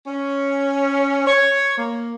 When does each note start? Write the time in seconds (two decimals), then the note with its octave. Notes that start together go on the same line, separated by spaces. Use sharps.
0.06 C#4
1.27 C#5
1.78 A#3